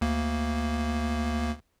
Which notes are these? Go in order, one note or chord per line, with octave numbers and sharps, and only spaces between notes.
D2 A#3